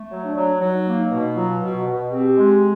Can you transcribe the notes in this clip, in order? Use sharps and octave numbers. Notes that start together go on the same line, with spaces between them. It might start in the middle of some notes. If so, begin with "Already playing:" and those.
Already playing: A3
F#3
D4
F#3
F#3 D#4
A#3
D#4
B2
F#3 F4
B2
F#4
B2
C4 G4
G#3